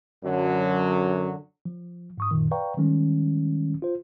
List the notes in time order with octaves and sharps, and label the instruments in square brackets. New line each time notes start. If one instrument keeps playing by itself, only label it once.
[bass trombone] F#2 [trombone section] D3 F#3
[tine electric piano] F3
G#2 C#6 D#6
F#2 A#2 D#3
B4 D5 F5 G5 A#5 C#6
D#3 F3 G3 G#3 C#4
F4 C5